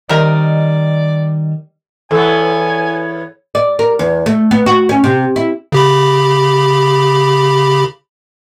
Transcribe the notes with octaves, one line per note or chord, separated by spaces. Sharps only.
C3 D#3 G3 A#4 D5 D#5
E2 B3 A4 C#5 G#5
D5
A#4
E2
A3
B3
F#4
C#4
C3
E4
C#3 G4 B5